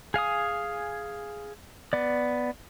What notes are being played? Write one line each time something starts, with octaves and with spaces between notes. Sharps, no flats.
G#4 F5 G#5 D#6
B3 D5